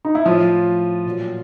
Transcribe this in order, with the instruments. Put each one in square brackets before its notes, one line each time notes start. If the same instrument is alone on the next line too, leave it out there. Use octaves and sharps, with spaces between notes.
[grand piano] D#4
E4
A2 F3 F4
A#2 F#3